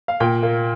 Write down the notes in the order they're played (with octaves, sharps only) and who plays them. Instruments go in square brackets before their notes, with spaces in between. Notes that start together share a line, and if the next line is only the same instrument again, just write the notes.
[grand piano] F5
A#2 G5
A#3